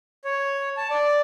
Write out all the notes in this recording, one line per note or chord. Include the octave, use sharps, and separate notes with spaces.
C#5
A5
D5